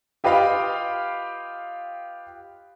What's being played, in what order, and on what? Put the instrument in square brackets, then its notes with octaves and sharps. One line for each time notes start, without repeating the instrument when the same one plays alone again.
[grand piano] F4 G4 B4 D#5 F5 G5